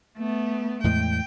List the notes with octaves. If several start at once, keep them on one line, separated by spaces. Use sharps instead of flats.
A3 B3
E2 A2 G#3 G5